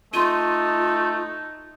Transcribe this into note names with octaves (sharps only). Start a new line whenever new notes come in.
A3 D#4 F4 C6 D#7